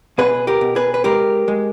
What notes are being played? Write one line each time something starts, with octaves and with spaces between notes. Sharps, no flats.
B2 G#4 B4
G4 A#4
B2
G#4 B4
B4
G#3 G4 A#4
G#3